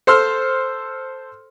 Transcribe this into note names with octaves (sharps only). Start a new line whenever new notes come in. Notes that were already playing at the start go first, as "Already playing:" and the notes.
A4 C5 C6 E6 F6